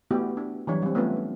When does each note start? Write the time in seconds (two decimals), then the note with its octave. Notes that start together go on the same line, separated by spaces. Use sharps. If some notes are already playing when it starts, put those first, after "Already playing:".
0.11 A3 B3 E4 F#4 G4
0.37 D4
0.67 E3 F#3 G3 D4 C#5
0.82 G3 C4
0.95 A3 B3 C#4 F4 B4
1.16 D4